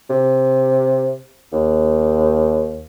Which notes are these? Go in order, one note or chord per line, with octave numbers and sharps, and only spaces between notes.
C3
D#2